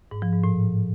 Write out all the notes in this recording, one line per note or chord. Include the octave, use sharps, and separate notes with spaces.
G#2
F3
G#2
A2